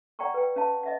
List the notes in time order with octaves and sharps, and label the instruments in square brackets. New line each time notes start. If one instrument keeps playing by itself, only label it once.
[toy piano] D5 F#5 G5 A#5 C#6
B4 G5
C#4 F5 A5
D#5 E5 F#5